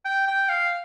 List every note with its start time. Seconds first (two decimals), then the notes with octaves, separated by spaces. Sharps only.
0.05 G5
0.27 G5
0.49 F5